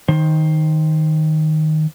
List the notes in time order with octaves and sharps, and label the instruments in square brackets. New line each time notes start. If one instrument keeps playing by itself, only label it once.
[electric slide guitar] D#3 C5